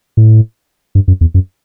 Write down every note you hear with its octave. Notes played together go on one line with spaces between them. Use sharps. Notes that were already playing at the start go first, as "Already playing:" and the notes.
A2
G2
F#2
E2
F#2